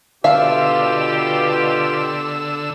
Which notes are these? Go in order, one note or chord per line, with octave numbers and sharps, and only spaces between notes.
B2 D3 F4 G4 E5 F5 E6